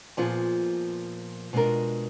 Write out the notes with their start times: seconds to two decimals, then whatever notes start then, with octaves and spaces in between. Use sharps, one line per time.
0.17 A#2 F3 B3 F4 G#4
1.53 B2 G#3 D4 F4 A#4